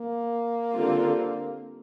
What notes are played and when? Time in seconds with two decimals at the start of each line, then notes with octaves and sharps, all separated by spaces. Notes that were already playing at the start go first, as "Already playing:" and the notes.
Already playing: A#3
0.73 D3 G3 C4 F4